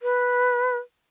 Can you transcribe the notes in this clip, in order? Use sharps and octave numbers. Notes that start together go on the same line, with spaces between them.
B4